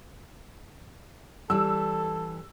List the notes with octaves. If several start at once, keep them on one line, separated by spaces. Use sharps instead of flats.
E3 G3 A4 E6